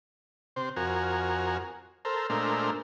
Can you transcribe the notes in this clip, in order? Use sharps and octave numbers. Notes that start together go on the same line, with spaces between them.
C3 C5
F2 F#4 A#4 G#5
A4 A#4 C5
A#2 G#3 A3 D4 A#4 C5